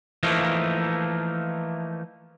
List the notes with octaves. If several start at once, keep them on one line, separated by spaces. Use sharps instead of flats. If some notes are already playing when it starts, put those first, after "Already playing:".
E3 F3 A3 A#3 D#4